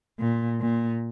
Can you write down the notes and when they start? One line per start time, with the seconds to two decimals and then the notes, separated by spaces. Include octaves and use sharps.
0.20 A#2
0.61 A#2